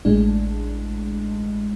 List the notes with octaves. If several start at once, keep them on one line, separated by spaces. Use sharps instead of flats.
A1 A2 G#3 D4